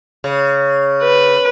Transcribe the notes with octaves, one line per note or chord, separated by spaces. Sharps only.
C#3
B4